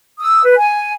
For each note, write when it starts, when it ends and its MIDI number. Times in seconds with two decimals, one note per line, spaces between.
0.19 0.43 87
0.19 0.43 88
0.43 0.54 71
0.56 0.93 80